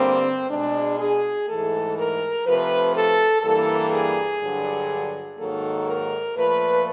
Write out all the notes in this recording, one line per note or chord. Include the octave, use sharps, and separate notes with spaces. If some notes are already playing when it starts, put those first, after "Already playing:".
Already playing: G2 D3 G3 A#3 C4
B2 G#3 D4
G#4
G#2 E3 A3 A4
A#4
C3 F3 A3 B4
A4
G2 E3 G3 A#3 A4
G#4
G2 D3 F#3
G#2 D#3 F#3 A#3 A4
A#4
A#2 F3 A3 B4